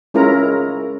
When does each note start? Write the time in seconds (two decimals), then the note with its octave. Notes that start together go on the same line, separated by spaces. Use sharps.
0.14 G#3 C#4 E4 F4 A#4 A#5